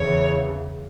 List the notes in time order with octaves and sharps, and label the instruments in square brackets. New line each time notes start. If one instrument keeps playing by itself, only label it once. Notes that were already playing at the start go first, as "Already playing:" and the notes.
Already playing: [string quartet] E2 C#3 E3 C#5